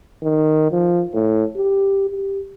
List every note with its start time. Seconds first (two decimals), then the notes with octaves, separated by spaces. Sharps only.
0.23 D#3
0.72 F3
1.14 A2
1.57 G4
2.10 G4